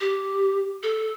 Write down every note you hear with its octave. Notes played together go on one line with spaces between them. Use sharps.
G4
A4